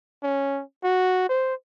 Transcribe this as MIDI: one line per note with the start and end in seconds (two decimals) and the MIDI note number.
0.23 0.62 61
0.84 1.26 66
1.29 1.54 72